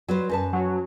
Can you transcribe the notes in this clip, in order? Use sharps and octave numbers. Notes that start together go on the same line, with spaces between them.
F#3 B4 C5
F#2 B4 A5
F#3